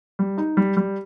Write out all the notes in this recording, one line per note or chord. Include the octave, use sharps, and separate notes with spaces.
G3
D#4
G3
G3